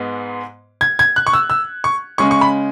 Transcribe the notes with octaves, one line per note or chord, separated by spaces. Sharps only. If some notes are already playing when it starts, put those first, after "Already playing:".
Already playing: G#2 G#3 B3
G#6
G#6
F#6
C#6
E6
E6
C#6
C#3 G#3 C#4 C#6
C#6
B5